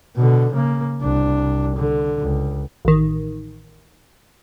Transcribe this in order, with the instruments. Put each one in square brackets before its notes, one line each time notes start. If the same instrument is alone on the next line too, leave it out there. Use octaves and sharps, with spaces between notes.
[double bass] B2 D3
C#3 A#3
C2 D4
D3
C#2
[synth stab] A1 D#3